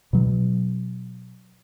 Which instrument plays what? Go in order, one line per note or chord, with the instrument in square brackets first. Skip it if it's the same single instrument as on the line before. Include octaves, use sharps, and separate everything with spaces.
[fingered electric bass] B2 F#3